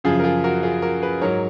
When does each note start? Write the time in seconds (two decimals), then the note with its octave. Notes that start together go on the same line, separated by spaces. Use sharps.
0.04 F#2 C#3 F3 F4 G#4
0.20 A#4
0.24 F4 G#4
0.44 F#4 A#4
0.63 F4 G#4
0.82 F#4 A#4
1.02 G#4 B4
1.21 G#2 F#3 A#4 C#5